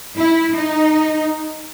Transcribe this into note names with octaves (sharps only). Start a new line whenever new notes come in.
E4
D#4